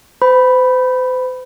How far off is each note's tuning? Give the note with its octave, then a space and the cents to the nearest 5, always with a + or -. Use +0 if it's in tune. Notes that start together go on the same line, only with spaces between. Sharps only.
C5 -40 B5 +0